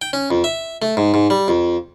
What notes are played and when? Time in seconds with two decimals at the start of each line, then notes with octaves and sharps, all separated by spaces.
0.02 G5
0.13 C#4
0.31 F2
0.44 E5
0.82 A3
0.97 G#2
1.14 G#2
1.30 G3
1.48 F2